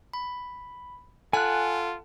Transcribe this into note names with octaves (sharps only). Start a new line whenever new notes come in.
B5
F4 A4 F#5 G#5 A5 F#6